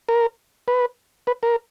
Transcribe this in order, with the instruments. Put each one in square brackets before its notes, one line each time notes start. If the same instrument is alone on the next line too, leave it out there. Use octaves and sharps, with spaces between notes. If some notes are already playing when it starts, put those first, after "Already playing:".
[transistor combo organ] A#4
B4
B4
A#4